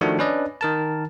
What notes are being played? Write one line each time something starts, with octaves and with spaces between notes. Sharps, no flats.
D#3 F3 A3 D4 F#4
C#4 D4 B4 D5 D#5
D#3 A#4 A5